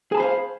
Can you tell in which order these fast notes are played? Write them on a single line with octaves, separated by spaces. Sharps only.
G#4 A5 B5 C5 F5